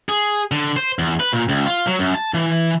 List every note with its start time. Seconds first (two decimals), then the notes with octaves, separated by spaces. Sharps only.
0.09 G#4
0.52 D3
0.76 C5
0.99 E2
1.20 B4
1.33 A#2
1.49 C#2
1.66 F4
1.87 F#3
1.99 F#2
2.15 A5
2.34 E3